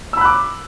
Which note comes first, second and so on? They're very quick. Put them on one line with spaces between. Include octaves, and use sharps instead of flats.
E6 B5 F#6 D6